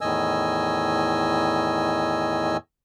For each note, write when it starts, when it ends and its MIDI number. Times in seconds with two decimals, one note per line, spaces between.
0.01 2.57 40
0.01 2.57 45
0.01 2.57 51
0.01 2.57 75
0.01 2.57 80
0.01 2.57 88